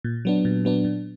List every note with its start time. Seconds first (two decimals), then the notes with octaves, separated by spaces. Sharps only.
0.04 A#2
0.25 F#3 B3 D4
0.45 A#2
0.65 F#3 B3 D4
0.85 A#2